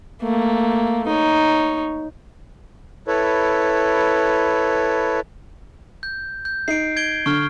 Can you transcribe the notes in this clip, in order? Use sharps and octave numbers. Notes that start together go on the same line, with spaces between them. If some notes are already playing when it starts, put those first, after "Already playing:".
A3 A#3
D#4 C#5
E4 A4 B4 C#5
G6
G6
D#4 C7 D7
G#6 D7 G7
D3 C#6 F6